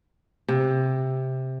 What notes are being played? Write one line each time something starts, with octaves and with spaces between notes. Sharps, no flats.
C3